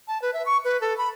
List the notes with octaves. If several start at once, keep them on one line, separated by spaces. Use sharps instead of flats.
A5
B4
E5
C#6
B4
A4
B5